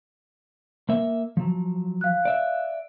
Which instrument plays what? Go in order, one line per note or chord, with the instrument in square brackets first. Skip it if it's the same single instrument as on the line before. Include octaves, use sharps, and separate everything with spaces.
[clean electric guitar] A#3 E5
F3 F#3
[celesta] F5 F#6
[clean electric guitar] D5 E5